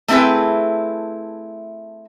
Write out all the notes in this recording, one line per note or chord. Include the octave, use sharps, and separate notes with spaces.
A3 C4 E4 G#4 B4